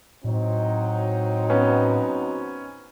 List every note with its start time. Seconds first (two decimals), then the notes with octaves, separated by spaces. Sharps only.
0.24 A2 F#3 C4 D#4
1.50 B3 C#4